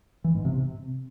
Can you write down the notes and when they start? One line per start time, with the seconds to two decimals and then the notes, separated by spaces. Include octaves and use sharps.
0.24 E3
0.35 G#2
0.45 C3
0.55 C3